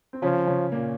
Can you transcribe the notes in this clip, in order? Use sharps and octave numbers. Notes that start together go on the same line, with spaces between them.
C4
C#3 F3 C#4
C#3 C#4
A#2 A#3